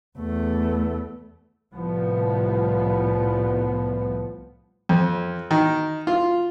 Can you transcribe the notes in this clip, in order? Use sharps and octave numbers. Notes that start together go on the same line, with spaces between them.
E2 A3
C2 A2 F3 B3
F2
D#3
F4